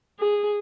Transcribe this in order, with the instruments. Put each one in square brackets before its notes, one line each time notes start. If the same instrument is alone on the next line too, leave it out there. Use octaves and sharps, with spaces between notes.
[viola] G#4